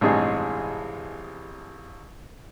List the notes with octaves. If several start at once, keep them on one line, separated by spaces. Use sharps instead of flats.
A1 G2 C3 G#3 D#4 G#4